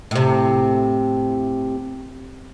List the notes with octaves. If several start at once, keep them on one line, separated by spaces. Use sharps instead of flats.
A2 C3